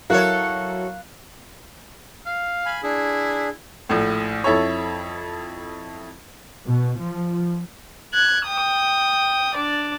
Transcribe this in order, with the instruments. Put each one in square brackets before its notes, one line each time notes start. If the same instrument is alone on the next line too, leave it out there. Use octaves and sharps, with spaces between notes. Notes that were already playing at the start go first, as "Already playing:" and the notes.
[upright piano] F#3 E4 A#4 [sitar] F#4 A4 C#5 [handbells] F5 F#6
[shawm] F5
[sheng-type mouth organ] G#5 B5
[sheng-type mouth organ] D4 G#4 [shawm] E4
[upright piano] A#1 A2
F2 E4 A4 C#5
[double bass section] B2
F3
[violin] F#6 G#6
G5 D#6
D4 D5